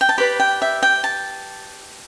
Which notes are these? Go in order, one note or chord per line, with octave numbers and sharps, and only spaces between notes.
G5
A5
G4 B4 D5 B5
G5
E5
G5
A5